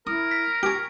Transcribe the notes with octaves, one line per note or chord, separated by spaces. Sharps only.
E4 A#4 D#6
B6
G4 G#5 C#6 D7